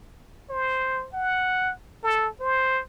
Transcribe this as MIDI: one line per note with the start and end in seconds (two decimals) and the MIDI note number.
0.50 1.07 72
1.13 1.72 78
2.04 2.28 69
2.40 2.81 72